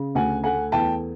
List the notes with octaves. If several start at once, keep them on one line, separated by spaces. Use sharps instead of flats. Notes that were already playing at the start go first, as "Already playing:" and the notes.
Already playing: C#3
D2 F#5 G#5
A3 F#5 G#5
E2 G5 A5